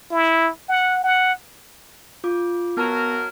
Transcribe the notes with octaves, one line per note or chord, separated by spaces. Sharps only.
E4
F#5
F#5
F4 D6
F#3 B3 F#4 A#4 A5 F6